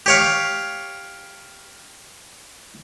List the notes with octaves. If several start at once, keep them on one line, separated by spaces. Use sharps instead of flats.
G4 C#5 F5